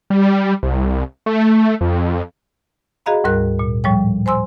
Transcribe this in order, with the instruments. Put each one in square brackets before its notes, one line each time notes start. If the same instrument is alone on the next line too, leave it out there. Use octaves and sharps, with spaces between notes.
[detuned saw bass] G3
C2
A3
F2
[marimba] F#4 G#4 D#5 F5 A#5 B5
D2 G#2 G3 A#4 F#6
A#2
A2 F3 G3 C#5 G5
C5 G#5 C6 E6